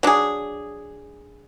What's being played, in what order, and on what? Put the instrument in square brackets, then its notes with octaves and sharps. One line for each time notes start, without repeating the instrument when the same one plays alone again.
[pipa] F#3 D4 G#4